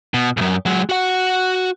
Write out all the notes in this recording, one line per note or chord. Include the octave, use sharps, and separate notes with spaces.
B2
B1 F#2
F#3 G#3
F#4 F#5